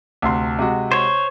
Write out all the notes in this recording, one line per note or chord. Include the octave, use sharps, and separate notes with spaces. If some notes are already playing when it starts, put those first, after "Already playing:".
D2 C3 C6
C3 G#3 F#4
C5 C#5